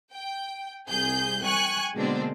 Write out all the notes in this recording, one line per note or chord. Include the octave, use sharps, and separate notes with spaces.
G5
C2 G#4 G6
G5 G#5 C#6 F#6
B2 D3 G#3 A#3 C4 D4